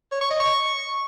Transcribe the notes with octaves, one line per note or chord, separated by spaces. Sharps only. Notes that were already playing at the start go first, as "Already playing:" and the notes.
C#5
C#6
D#5
C#6